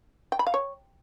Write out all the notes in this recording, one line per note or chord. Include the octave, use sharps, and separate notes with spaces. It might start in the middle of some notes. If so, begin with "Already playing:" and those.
G5
B5
F5
C#5